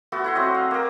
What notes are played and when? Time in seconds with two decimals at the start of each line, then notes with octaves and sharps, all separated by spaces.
0.12 A3 B3 F#4
0.24 E4 F#5 C6
0.35 F#3 C4 D#5
0.55 F5
0.71 A#3 A#4